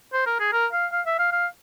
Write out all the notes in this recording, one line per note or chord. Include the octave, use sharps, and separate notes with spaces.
C5
A#4
G#4
A#4
F5
F5
E5
F5
F5